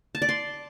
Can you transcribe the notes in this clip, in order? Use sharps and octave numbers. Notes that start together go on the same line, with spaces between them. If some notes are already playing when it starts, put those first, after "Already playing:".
A5
D5
C6